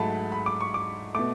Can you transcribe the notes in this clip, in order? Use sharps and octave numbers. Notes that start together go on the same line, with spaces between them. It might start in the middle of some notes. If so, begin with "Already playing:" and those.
Already playing: G#2 F#3 A3 A5 B5
B5
D6
C#6
D6
B2 A3 D6